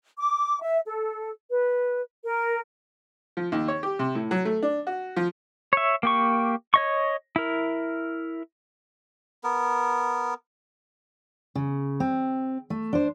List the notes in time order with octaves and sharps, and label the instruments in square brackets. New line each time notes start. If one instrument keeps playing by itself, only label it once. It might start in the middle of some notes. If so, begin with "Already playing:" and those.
[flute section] D6
E5
A4
B4
A#4
[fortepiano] F3
D#2
C#5
G4
C3
A2
F#3
A3
D4
F#4
F3
[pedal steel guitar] C#5 E5
A#3 G4 C#6
C#5 D#5 C#6
E4 A#4
[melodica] B3 A#4
[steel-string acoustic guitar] C#3
C4
A3
D4 C5